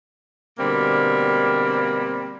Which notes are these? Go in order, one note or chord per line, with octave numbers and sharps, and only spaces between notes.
B2 D3 G3 A#3 C4